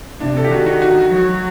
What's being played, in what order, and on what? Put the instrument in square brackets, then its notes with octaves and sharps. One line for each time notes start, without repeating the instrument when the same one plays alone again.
[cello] C3 [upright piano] D4
[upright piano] A4
G4
[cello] D#3 [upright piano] F#4
[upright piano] F#4
F#4
[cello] F#3